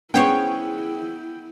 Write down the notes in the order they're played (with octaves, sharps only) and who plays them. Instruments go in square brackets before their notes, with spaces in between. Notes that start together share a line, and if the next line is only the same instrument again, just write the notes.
[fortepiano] B3 C#4 [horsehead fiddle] E4 [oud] G#4 C5 C#5 [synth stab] G5